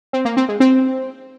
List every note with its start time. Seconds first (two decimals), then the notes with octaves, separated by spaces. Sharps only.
0.13 C4
0.25 A#3
0.37 C4
0.48 G#3
0.60 C4